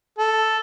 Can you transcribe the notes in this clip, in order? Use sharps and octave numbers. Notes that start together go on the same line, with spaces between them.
A4